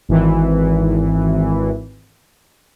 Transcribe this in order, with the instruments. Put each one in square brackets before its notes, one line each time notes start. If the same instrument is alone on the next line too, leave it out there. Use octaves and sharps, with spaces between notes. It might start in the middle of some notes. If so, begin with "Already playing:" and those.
[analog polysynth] G#1 E3